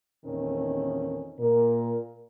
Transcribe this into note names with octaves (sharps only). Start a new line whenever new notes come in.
E2 A#2 D#3 C4 C#4 A4
A#2 A#4